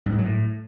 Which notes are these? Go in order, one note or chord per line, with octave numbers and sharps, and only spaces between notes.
G2
G#2
F#3
A2